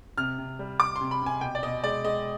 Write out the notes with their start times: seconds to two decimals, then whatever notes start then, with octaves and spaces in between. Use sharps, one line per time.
0.17 C3 F6
0.38 C3
0.59 G3
0.79 G3 D6
0.96 C6
1.01 C3
1.11 B5
1.22 C3 G#5
1.41 B2 G5
1.55 D5
1.63 B2 D#5
1.83 G#3 D5
2.04 G#3 D#5